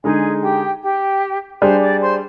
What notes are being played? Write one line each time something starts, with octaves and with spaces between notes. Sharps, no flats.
D3 G#3 D#4 G#4 G#5
G4 G5
G4 G5
G3 D4 G#4 C5 C6
D5 D6
C5 C6